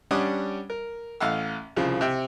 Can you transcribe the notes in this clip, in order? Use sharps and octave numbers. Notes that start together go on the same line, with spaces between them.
G3 C#4 D4 F#5 D#6
A#4
A1 F5 F#5 E6
C2 C#3 F3
C3 E5 G5